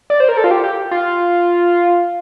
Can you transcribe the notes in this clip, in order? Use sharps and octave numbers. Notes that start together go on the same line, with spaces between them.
D5
C5
A#4
A4
F4
G4
G4
F4